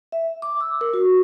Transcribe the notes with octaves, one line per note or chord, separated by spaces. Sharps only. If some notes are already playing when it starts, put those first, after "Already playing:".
E5
D6
E6
A#4
F#4